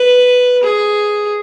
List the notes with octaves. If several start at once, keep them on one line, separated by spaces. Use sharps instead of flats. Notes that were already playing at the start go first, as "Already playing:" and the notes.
Already playing: B4
G#4